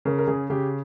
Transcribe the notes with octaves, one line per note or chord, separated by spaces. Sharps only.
C#3 A#4
A#4
C#3 G#4
C#3 G4